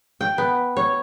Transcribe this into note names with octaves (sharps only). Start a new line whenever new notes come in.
G5
B3
C#5